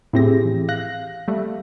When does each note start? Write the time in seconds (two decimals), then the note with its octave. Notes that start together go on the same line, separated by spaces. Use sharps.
0.13 A2 C4 E4 G4 G#4 A#6
0.44 E3
0.69 F5 F#6 A#6
1.28 G3 A3